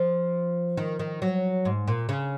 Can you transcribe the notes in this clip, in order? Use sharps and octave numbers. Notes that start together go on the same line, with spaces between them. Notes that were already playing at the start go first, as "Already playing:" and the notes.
Already playing: F3
D#3
D#3
F#3
G#2
A#2
C#3